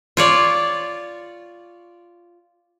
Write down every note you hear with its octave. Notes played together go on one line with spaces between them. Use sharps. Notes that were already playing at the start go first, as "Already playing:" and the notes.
F4 C#5 D5